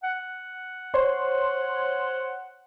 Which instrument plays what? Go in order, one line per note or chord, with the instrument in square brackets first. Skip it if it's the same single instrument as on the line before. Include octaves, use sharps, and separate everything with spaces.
[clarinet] F#5
[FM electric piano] C5 C#5 C6